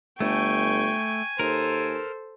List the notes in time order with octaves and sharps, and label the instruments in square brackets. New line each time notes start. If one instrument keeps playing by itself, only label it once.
[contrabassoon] G1 [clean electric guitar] A3 [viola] G5 C#6 [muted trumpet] G#5
[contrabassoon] D#2 [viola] A4 C5 [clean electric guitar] A#4